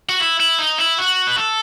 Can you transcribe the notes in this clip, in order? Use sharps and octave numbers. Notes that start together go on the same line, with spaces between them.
F#4
E4
E4
D#4
E4
F#4
B4
A4